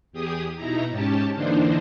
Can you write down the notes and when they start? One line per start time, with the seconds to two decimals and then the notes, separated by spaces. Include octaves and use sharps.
0.12 E2 G4 G#4 D#6
0.55 B2 D#4 E4 A#5
0.89 G#2 C#4 G4 A5
1.34 D3 E3 A#3 D4 D#4 C5